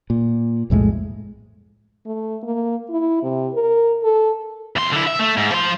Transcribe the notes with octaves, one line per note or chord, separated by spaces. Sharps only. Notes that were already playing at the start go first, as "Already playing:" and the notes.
A#2
B1 F2 A2 G#3
A3
A#3
E4
C3
A#4
A4
E2 C6
D3 E4
E5
A3
G#2
F3 C6